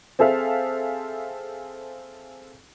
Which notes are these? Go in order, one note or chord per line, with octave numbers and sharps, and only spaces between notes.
C4 G#4 A4 E5 F5